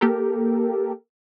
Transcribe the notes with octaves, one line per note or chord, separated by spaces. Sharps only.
A#3 G4 A4 A#4